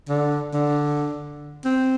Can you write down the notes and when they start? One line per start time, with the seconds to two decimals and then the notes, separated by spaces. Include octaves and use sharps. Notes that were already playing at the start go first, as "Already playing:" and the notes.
0.09 D3
0.54 D3
1.65 C4